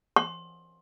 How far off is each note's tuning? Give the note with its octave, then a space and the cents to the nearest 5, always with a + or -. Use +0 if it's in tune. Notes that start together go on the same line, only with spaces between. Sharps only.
C6 +20